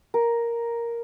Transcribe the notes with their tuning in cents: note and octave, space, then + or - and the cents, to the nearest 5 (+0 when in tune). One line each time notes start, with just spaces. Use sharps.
A#4 +5